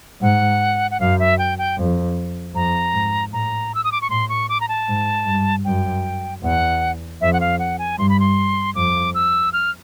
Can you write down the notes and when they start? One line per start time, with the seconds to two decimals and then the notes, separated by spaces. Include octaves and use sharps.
0.22 G#2 F#5
0.91 F#5
1.00 F#2 F5
1.19 E5
1.38 G5
1.58 G5
1.78 F2
2.54 F2 A#5
2.93 G#2
3.32 A2 A#5
3.75 E6
3.84 D#6
3.92 D6
4.02 C#6
4.10 A2 C6
4.29 C#6
4.49 D6
4.61 A#5
4.68 A5
4.88 G#2
5.26 G2
5.65 F#2 G5
6.43 E2 F#5
7.21 F2 E5
7.33 F#5
7.41 F5
7.59 F#5
7.79 G#5
7.98 G2 C6
8.09 B5
8.20 C6
8.75 F2 D6
9.15 E6
9.53 F6